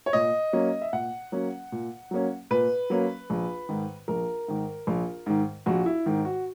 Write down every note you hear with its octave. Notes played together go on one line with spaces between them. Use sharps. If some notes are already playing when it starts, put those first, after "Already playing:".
C#5
A#2 D#5
F#3 A#3 C#4
E5
A#2 F#5
F#3 A#3 C#4
A#2
F#3 A#3 C#4
A#2 B4
F#3 A#3 C#4
A#1
G#2 D#3
A#1 A#4
G#2 D#3
A#1
G#2 D#3
A#1 F#4
E4
G#2 D#3
F#4